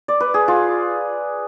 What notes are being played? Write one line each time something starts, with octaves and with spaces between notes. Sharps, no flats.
D5
B4
G#4
F4